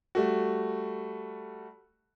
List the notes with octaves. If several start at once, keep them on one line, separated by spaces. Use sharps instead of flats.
G3 A3 F#4